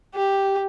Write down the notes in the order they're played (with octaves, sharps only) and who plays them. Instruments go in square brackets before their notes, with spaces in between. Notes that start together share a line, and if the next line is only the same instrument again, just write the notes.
[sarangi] G4